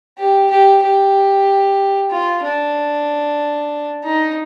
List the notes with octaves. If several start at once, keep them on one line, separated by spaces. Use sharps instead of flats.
G4
G4
G4
F4
D4
D#4